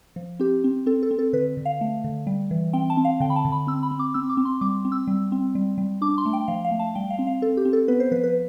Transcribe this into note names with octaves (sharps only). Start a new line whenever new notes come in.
F3
C4 G4
C4
C4 A4
A4
C4
A4
D3 B4
D3
F5
A3
D3
G3
E3
C4 G5
A5
C4
F5
D3 G5
B5
A5
D3
B5
C4 E6
B5
C4
D6
C4 E6
D6
C4
C6
G3 D6
C4
E6
G3
C4
G3
G3
D4 D6
C6
A3
G5
F3 F5
F5
A3
A5
G3 G5
F5
C4
F5
C4 A4
G4
C4
A4
B3 B4
C5
F3 B4
B4